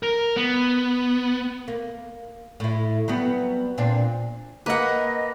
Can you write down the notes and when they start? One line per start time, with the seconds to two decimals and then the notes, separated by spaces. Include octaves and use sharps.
0.03 A#4
0.36 B3
1.68 A#3
2.60 A2 E4
3.08 F#3 G3 B3
3.78 A#2 C4 D4
4.66 A#3 B4 D#5 F#5